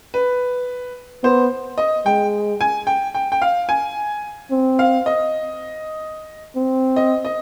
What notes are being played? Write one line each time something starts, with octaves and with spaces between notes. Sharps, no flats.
B4
B3 C5
D#5
G#3 G5
G#5
G5
G5
G5
F5
G#5
C4
F5
D#5
C4
D#5
D#5